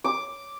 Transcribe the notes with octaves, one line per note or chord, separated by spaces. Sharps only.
D6